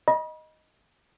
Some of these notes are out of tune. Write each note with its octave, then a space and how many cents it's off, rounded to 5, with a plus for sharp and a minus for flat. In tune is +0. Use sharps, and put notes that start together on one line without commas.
D#5 +0 B5 -40